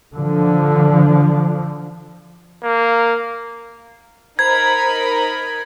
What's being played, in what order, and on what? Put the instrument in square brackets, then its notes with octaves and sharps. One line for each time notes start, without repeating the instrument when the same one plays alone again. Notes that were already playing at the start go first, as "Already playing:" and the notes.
[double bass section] D3 F3
[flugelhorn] A#3
[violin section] D#4 A#4 B5 [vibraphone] C5 A#5 [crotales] G#6